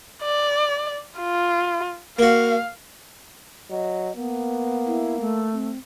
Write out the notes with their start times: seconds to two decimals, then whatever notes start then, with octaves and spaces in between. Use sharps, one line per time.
0.23 D5
1.19 F4
2.19 A#3 F#4 F5
3.70 F#3 D#5
4.17 A#3 B3
4.86 E4
5.20 A3
5.53 C4